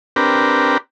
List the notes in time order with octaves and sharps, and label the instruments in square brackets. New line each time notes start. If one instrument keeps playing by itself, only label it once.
[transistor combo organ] C4 D4 G4 A#4 B4